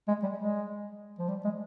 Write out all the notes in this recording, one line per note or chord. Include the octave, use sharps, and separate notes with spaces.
G#3
G3
G#3
F3
G3
G#3